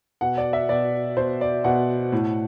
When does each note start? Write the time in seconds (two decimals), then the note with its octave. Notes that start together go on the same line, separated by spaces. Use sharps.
0.21 B2 F#5
0.37 D5
0.53 E5
0.69 B2 D5
1.17 B2 C5
1.41 D5
1.64 B2 F#5
2.12 A2